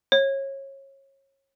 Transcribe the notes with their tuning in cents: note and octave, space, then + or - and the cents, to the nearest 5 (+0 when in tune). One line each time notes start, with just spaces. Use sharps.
C#5 -25